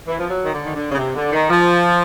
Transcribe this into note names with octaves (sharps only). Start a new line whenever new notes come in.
E3
F3
F#3
D#3
D3
D#3
D3
C#3
C3
D3
D#3
F3